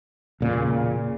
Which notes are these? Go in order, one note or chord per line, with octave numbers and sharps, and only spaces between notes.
E1 A#2 C#3